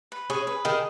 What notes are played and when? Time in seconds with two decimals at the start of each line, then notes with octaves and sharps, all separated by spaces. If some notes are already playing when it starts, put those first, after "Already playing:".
0.12 B4
0.30 C#4 G#4
0.47 B4
0.65 D#3 G#4